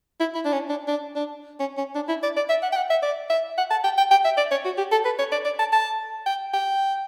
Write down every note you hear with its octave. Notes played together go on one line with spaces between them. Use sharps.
E4
E4
D4
C#4
D4
D4
D4
C#4
C#4
D4
E4
D5
D5
E5
F#5
G5
F#5
E5
D5
E5
F#5
A5
G5
G5
G5
E5
D5
C#5
F#4
G4
A4
B4
C#5
D5
D5
A5
A5
G5
G5